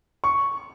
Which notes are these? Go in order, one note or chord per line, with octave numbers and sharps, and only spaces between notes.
C#6